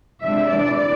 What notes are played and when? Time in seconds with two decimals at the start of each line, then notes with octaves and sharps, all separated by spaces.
0.22 C3 F3 G#3 D4 E5
0.51 C3 E3 G#3 D5